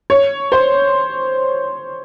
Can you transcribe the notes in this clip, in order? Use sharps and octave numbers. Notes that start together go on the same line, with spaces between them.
C#5
C5